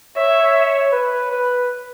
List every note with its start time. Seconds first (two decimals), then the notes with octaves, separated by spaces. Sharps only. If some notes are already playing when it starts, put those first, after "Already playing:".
0.17 C#5 E5
0.93 B4
1.31 B4